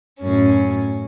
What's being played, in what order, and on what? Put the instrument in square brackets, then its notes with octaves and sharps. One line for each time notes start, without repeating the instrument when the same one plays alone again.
[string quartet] F#2 A2 C#4